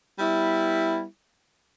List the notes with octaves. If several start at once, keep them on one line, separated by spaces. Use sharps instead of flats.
G3 B3 E4